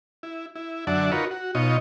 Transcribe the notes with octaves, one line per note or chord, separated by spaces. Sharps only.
E4
E4
F#2 D3 D5 E5 F#5 A5
D#4 F4 F#4 A#4 B4 C#5
F#4
B2 D#4 F4 C#5 D#5